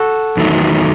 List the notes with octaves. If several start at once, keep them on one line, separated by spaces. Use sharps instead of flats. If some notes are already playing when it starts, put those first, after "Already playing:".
Already playing: F#4 A4
E2 D#3 F#3 A3